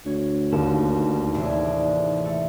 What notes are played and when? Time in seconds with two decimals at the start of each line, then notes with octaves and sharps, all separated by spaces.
0.06 D2 C#5
0.52 G1 D#2 G4 E7
1.34 A2 C3 E3 D4 G#4
2.25 A3